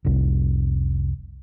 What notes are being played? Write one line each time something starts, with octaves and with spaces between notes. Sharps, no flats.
F1 C2